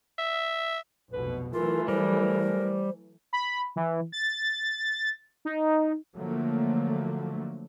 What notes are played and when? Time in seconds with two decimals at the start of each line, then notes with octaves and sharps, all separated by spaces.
0.18 E5
1.13 F1 B1 B2 B4
1.53 E3 F#3 A3 F4 A#4
1.88 G3 A#4 C5
3.33 B5
3.76 E3
4.12 A6
5.45 D#4
6.16 D3 F3 F#3 A3 A#3